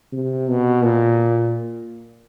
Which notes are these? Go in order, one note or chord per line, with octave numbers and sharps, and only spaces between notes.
C3
B2
A#2